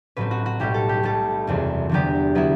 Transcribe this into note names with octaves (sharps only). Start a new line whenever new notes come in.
A1 A2 F#3 C4 B4
F#4
F#4
B1 A2 G3 G4
A4
G4
B1 B2 G3 A4
F#1 E2 C3 F#3 C4
E2 D3 F#3 B3 G4
F#3 B3 E4